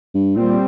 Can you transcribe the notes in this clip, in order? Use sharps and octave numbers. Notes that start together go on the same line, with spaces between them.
G2
A#2 G3 C4